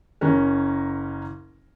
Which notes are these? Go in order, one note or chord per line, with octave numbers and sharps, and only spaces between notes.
F#1 C#4 A#4